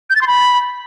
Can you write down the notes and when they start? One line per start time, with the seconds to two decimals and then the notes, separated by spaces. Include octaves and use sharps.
0.10 G6
0.16 A6
0.21 C6
0.27 B5